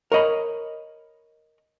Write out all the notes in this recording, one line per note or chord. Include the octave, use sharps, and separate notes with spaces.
A#4 C#5 D#5 B5